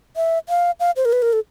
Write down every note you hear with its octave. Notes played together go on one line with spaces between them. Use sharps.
E5
F5
F5
C5
A#4
B4
A#4
A4